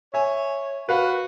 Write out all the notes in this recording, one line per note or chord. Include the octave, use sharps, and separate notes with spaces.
C#5 E5 G#5
F#4 B4 F5